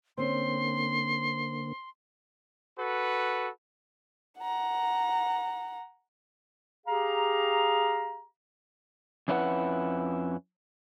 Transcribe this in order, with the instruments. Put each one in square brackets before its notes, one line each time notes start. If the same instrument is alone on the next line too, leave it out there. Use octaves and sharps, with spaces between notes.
[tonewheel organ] D3 A#3 [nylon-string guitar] C4 C#4 C5 [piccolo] C6
[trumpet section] F#4 A4 B4
[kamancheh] F#5 A#5
[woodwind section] G4 G#4 F5 A#5
[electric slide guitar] F2 C#4 E4 F4 B4 F#5